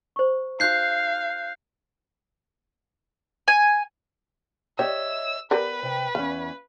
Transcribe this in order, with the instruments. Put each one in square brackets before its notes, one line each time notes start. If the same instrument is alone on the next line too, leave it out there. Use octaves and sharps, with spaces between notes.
[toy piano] C5 C#6
[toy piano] D#4 F#4 [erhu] F5 [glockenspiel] F#6 G6 C7
[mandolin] G#5
[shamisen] G4 [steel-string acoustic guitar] C#5 D#5 E5 [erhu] E6
[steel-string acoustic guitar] B3 [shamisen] G4 A#4 D5 [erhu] B4
[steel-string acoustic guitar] C3 G5
[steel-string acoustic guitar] E2 C#4 [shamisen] F5